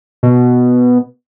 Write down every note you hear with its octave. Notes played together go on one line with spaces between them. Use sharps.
B2